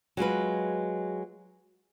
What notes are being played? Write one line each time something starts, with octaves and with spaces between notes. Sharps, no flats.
F#3 G#3 F4 B4